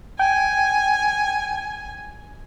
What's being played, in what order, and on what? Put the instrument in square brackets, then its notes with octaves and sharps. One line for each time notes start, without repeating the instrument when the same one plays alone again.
[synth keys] G5 [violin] G#5